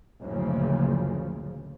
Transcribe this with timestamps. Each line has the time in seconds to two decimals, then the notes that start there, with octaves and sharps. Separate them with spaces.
0.20 F#1 D2 A#2 C#3 F3